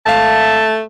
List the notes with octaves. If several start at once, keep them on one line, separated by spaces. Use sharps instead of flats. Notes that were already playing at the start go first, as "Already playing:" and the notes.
G#1 A3 E5 F5 A5